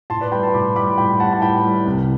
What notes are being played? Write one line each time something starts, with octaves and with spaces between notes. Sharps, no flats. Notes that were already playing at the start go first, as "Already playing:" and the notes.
A2 A5 C6
B4 D5
G3 G5 B5
A5 C6
A2 B5 D6
G3 B5 D6
A2 G5 B5
G3 F#5 A5
A5
A2 G5 B5
G3
C2